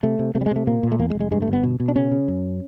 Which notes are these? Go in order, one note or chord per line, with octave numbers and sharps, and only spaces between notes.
C3 A3
C3
C3 A3
G3
G#3
C3 A3
A#2 A#3
A#2
A3
E2 A#3
G#3
F1
G#3
G2 G#3
A3
G1
B3
B2
B2
D4
C#3 C#4
C#3
F#2